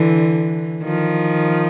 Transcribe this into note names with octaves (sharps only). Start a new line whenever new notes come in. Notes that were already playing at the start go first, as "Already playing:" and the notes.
Already playing: D3 E3
D#3 F3